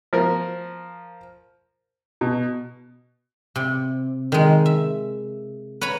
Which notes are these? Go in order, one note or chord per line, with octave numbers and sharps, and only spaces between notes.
F3 A#4
B2
C3
D#3 G#3
E5
B4 C#5 A#5 B5